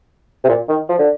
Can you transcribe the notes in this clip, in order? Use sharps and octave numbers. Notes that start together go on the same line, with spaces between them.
C3
A#2
D#3
F3
D3